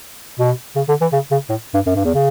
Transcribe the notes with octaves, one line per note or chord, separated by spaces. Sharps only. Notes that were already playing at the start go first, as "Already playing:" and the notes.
B2
C#3
D3
E3
C#3
C#3
A2
G2
F#2
G2
E2
C#3